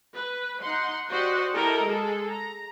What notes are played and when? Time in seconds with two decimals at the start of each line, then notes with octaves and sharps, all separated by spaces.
0.14 B4
0.62 D#4 F#5 C6
1.10 F#4 G4 C5 D5 D#5 F#5
1.53 E4 G4 A4 A#4 D#5
1.82 G#3 G#4 A4
2.29 A#5